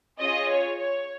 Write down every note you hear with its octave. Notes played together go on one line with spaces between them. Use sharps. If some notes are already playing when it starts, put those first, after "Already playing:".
C#4 F4 G#4 D#5
C#5
C#5